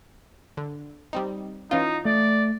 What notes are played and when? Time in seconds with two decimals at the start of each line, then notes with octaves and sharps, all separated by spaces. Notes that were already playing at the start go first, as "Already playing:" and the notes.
0.57 D3
1.13 G3 C4 D#4
1.71 E3 C#4 D#4 F4
2.05 A3 D5